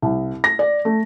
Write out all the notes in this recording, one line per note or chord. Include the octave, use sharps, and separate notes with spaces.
C2
A#6
D5
A3